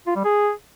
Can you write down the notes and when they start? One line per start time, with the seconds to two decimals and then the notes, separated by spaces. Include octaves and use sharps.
0.07 F4
0.16 G3
0.25 G#4